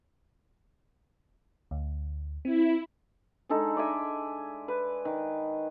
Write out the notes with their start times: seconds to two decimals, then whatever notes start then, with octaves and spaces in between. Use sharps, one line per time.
1.71 D2
2.45 C4 E4
3.49 G#3 D4 D#4 A4
3.77 D5 E5 G#5
4.68 B4
5.05 D#3